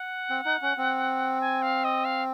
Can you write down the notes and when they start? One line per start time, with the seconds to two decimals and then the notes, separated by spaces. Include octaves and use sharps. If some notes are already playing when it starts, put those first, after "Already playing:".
Already playing: F#5
0.30 C4
0.46 D#4
0.62 C#4
0.77 C4
1.41 G#5
1.62 F5
1.84 D#5
2.05 F5